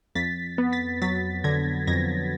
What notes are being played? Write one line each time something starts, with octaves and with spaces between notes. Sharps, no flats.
F2 A6 B6
B3
A6 B6
F#3 A6 B6
D3 G#6 A#6
F2 G#6 A#6